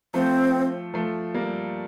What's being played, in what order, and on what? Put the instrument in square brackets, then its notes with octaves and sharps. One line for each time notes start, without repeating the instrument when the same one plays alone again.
[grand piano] F3 A3 [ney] C4
[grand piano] F3 A3
G3 A#3